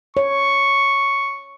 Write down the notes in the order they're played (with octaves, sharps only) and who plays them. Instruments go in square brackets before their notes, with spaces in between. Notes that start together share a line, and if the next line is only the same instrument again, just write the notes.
[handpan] C#5 [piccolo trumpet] C#6